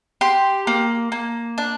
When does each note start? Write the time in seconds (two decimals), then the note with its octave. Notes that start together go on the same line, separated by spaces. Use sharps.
0.21 G4 C6
0.67 A#3
1.12 A#3
1.58 D4